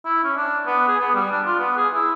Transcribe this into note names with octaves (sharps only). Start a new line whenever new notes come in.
E4
C#4
D4
B3
G#4
B3
G3
D4
F4
B3
G#4
E4